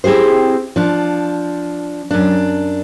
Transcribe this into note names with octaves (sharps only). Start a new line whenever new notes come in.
C4 E4 G4 G#4 C5
F3 D4
F#2 D4